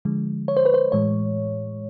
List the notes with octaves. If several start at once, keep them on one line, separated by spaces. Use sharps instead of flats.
D3 F3 G#3
C#5
C5
B4
C5
A2 E3 G#3 C#5